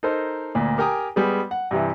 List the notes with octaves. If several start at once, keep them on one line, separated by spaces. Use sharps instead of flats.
D#4 A4 A#4 C5
D2 A#2
G4 A#4 G5 G#5 A#5 D#6
G3 G#3 B3 G#4
F#5
G2 C3 E3